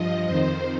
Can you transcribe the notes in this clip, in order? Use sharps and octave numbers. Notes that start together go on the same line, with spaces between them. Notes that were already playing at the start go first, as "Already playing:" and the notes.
Already playing: G2 F3 D#5
F2 D#3 C5